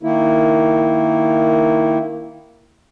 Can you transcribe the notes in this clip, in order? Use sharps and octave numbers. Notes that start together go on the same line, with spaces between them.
D#3 A#3 E4